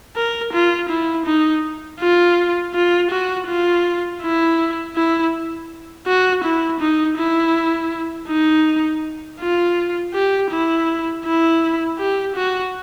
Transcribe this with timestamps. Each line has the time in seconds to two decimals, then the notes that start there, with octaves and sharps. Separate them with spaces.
0.16 A#4
0.53 F4
0.89 E4
1.26 D#4
2.00 F4
2.75 F4
3.11 F#4
3.48 F4
4.22 E4
4.96 E4
6.07 F#4
6.44 E4
6.81 D#4
7.18 E4
8.29 D#4
9.41 F4
10.14 G4
10.51 E4
11.25 E4
11.99 G4
12.36 F#4